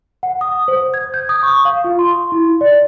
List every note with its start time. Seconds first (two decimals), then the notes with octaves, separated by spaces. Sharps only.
0.23 F#5
0.41 D#6
0.68 C5
0.94 G#6
1.14 G6
1.29 D#6
1.43 C#6
1.65 F5
1.84 F4
1.99 C6
2.32 E4
2.61 D5